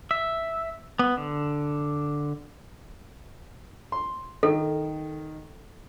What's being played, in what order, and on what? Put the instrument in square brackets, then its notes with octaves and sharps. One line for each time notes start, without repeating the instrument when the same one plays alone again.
[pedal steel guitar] E5
B3
D3
[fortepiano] C6
[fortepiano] D#3 [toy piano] A4